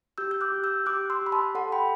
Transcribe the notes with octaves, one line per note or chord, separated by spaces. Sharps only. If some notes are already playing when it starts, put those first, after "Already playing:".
G4 E6 G6
G6
D6 F#6
G4
E6 G6
G4 D6 F#6
C6 E6
G4
B5
A5 C6
A4 F#5 A5
G5 B5